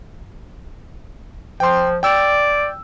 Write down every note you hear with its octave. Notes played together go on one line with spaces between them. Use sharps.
F3 G5 C6
D5 G5 E6